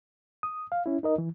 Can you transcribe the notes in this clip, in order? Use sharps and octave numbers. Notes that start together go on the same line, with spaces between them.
D#6
F5
C#4 E4
D#4 A#4 D#5
E3